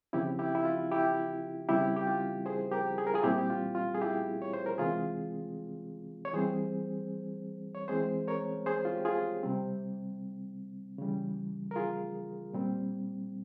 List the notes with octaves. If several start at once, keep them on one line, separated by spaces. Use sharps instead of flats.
C#3 F3 C4 E4 G4
E4 G4
E4
F4
E4 G4
C#3 G3 C4 E4 G4
G4
F4
G#4 C5
G4 A#4
G#4
A#4
F4 G#4
A#2 G3 C4 E4 G4
G4
F4
F4
G#4
E4 G4
C#5
C5
A#4
C3 E3 G#3 C4 F4 G#4
C#5
E3 G3 C4 G#4 C5
C#5
E3 G#3 C4 G#4 C5
A#4 C#5
G#4 C5
F4
G4
F4 G#4
C3 G3 C4
C#3 E3 G3
A#4
F4 G#4
A#2 G3 C4